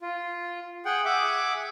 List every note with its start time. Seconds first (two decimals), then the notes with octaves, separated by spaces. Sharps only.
0.01 F4
0.85 G#4 F#5 G5
1.05 G#4 E5 F#5 D6